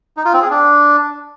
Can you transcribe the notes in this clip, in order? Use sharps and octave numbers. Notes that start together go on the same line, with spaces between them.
D#4
F4
C4
G#4
D4